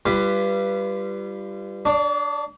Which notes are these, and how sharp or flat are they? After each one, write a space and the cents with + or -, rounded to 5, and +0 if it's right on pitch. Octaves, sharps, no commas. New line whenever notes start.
G3 +0 F4 -35 B4 +0
D4 +10 D5 -45